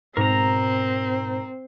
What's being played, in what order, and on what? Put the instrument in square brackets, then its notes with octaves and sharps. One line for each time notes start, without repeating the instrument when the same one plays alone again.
[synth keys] G#2 B2 [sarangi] C4 [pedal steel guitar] A#4 A#5